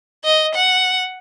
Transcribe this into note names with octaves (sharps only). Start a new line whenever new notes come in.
D#5
F#5